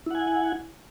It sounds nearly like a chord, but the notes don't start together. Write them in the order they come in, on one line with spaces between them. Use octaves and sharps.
E4 F#5 G#5